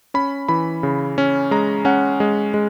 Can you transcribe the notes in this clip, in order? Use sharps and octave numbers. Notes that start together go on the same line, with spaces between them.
C#4 B5
E3 B5
C#3
C#4
G#3 A#5
C#4 F#5
G#3
G#3